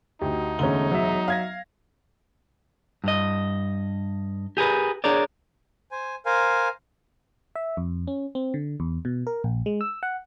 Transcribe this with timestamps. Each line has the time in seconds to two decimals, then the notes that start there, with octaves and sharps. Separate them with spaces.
0.21 D2 D#4 F#4 G4
0.59 E1 D3 A3 C#4 A#5 G7
0.91 F#3 E5
1.28 F5 G#6 A#6
3.04 G2 D#5
4.57 G4 G#4 A#4 B4
5.04 D4 G#4 A#4 C#5 D5
5.90 C5 G#5
6.26 A#4 C5 F5 G#5
7.55 E5
7.77 F2
8.07 C#4
8.35 C4
8.54 D3
8.80 E2
9.05 B2
9.27 A#4
9.44 A#1
9.66 G#3
9.81 E6
10.03 F#5